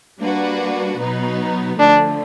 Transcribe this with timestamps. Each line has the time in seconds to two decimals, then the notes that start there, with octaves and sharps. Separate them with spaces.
0.20 G3 A#3 D4 F#4 B4
1.00 B2 F#3 B3 D#4
1.79 D3 F3 A3 D4